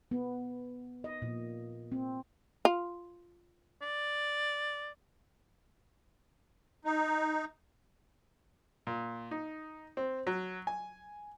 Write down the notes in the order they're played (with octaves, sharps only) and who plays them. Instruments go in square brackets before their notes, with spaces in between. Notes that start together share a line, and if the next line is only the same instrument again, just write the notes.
[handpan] B3
D#5
A#2
C4
[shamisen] F4
[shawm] D5
[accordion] D#4
[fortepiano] A#2
D#4
C4
F#3
G#5